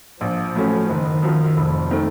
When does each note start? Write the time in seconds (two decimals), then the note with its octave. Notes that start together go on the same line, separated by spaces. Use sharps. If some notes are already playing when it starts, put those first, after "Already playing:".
0.21 A#1 F3
0.55 A2 F#3 A3 C#4
0.88 F#1 D#3
1.23 F#2 F3
1.57 F1 F2
1.91 D#3 A3 C4